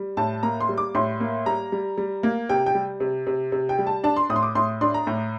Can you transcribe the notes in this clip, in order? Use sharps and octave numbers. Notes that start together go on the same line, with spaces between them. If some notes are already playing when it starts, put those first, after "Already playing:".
Already playing: G3
A2 A5
A#3 A#5
C6
G3
D6
A2 C6
A#3
G3 A#5
G3
G3
A#3
C3 G5
G5
G3
C3
C3
C3
G5
G3
A5
D4 A5
C6
A2 D#6
C6
D6
A2 C6
D4 C6
A#5
A2